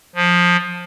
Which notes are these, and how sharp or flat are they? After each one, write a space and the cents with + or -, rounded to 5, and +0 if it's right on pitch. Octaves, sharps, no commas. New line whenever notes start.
F3 +15